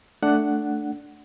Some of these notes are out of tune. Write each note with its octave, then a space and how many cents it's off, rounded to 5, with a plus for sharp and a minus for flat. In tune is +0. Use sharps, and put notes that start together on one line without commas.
A3 +0 D4 +0 F#5 +5